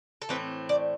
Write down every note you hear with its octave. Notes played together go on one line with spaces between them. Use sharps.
A4
A2 E3 A3 C4 B4
D5